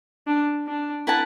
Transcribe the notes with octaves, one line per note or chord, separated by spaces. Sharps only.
D4
D4
E4 B4 F#5 A5